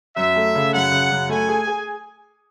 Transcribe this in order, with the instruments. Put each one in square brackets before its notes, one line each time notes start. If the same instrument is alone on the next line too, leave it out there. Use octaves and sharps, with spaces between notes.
[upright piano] F#2 [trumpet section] E5
[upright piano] A3
C#3
[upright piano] F#2 [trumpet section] F#5
[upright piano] C#3
F#2
[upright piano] A3 [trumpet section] G#5
[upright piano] G#4
G#4